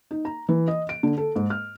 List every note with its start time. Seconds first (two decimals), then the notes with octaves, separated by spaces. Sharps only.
0.11 D#4
0.25 A#5
0.49 E3
0.68 D#5
0.89 D7
1.03 D3
1.18 A4
1.36 G#2
1.50 F6